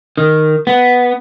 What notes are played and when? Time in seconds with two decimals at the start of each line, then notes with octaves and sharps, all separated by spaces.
0.17 D#3
0.67 B3